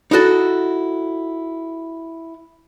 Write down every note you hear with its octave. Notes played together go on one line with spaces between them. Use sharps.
D#4 E4 F#4 A4